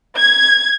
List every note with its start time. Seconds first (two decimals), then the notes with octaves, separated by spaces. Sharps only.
0.18 G#6